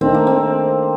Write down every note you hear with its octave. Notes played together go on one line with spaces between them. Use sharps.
D#3 A3 C4 D4
A#3
C4